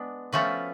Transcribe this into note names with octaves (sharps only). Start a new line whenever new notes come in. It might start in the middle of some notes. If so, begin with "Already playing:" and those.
Already playing: G#3 B3 D4
F3 A3 C#4 F#4 B4